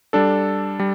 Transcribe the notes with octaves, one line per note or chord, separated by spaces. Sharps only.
G3 D4 A4
G3